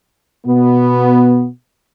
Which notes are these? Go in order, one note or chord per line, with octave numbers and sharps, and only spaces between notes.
B2 B3